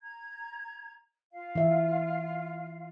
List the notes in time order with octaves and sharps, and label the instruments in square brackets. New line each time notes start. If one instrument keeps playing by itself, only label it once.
[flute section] A#5 G#6
F4 F5
[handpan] E3 E5